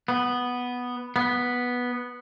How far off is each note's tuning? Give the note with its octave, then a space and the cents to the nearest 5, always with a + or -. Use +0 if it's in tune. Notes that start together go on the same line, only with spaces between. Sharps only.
B3 +0
B3 -5